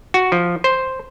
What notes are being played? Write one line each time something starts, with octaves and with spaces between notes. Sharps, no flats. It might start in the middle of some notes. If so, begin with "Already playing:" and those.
F#4
F3
C5